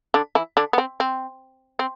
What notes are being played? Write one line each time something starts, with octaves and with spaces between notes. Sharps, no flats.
D3 D4
E3 E4
D3 D4
B3
C4
C4
C4